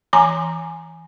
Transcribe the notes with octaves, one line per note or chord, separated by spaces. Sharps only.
E3 G#5 A#5 C6 D6